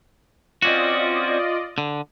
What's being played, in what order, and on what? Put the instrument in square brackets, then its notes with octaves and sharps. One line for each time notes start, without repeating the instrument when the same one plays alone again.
[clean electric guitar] C4 C#4 F#4 [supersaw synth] F4 D5 D#5
[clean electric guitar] D3